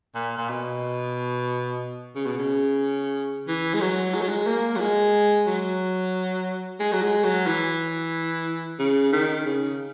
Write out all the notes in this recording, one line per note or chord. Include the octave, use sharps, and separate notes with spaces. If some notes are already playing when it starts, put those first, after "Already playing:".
A#2
A#2
B2
C#3
B2
C#3
E3
G#3
F#3
G#3
F#3
G#3
A#3
F#3
G#3
F#3
G#3
F#3
G#3
F#3
E3
C#3
D#3
C#3